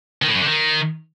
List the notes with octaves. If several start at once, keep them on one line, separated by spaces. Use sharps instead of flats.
D#3
A2
F#2
D3
D#3